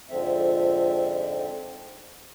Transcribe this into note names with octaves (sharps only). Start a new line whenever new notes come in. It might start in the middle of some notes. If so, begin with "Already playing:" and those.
F2 G#2 D3 F3 C4 E5